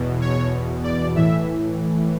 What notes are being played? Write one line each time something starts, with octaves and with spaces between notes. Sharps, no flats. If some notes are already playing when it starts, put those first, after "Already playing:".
Already playing: E2 B2
C#5
D5
A2 E3 E5